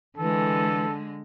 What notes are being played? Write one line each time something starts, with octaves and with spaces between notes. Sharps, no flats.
D3 E3 G#3 A4